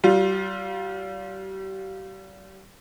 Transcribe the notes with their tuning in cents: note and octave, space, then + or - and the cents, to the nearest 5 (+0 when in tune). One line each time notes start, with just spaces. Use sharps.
G3 -35 F4 +10